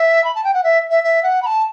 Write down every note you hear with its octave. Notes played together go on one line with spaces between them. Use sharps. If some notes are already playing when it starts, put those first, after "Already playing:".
Already playing: E5
B5
A5
G5
F#5
E5
E5
E5
F#5
B5
A5